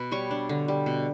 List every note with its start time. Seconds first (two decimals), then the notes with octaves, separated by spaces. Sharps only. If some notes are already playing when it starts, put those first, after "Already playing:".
Already playing: B2 B4 B5
0.11 G3 C#5 C#6
0.31 D4
0.49 D3
0.68 G3
0.86 B2